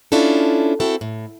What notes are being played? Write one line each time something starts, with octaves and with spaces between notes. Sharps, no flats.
C#4 D4 E4 F4 A4
C4 E4 F#4 A4
A2